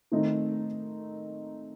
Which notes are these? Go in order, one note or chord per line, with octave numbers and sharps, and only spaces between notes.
D#3 A3 C4 D#4